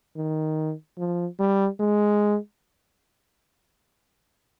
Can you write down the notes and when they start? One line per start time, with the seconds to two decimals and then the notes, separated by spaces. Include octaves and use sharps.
0.16 D#3
0.98 F3
1.39 G3
1.80 G#3